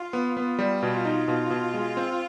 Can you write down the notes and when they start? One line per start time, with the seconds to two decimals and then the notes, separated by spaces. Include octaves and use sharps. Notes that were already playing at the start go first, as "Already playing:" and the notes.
Already playing: F4
0.13 B3
0.37 B3
0.59 G3
0.82 B2 F4
1.05 D#4
1.28 B2
1.50 B2
1.74 G#3
1.97 C4